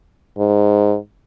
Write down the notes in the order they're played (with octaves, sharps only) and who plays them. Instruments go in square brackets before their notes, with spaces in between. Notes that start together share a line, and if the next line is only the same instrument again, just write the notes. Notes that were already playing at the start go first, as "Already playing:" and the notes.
[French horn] G#2